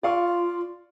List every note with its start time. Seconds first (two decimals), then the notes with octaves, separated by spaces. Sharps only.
0.03 F4 D5 F5 C#6